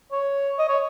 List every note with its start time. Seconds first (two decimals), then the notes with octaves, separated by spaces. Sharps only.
0.12 C#5
0.59 D#5
0.68 C#5